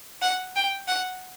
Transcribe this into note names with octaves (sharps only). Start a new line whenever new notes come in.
F#5
G5
F#5